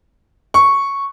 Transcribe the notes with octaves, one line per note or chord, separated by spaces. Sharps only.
C#6